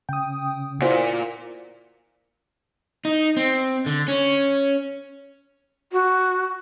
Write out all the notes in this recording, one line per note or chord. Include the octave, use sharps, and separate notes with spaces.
C#3 G5 D#6
A#2 E4 F#4 C5
D#4
C4
D3
C#4
F#4